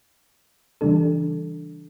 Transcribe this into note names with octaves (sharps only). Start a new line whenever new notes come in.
C#3 E3 G3 D4 A4